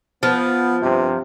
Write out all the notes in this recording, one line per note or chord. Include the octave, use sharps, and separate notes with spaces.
F3 B3
G2 C3